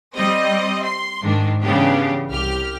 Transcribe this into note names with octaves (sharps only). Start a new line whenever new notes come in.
G3 C4 D#5
C6
G#2 D#3 D4
C#3 E3 B3 D4 G4
C2 G4 F6